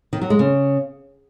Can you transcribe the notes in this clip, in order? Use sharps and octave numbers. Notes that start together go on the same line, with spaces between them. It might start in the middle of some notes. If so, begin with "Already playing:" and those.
D#3
F#3
G#3
C#3